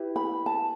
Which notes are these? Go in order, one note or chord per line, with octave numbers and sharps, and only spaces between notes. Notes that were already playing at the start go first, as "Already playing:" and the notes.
Already playing: E4 G4 B4
B5
A5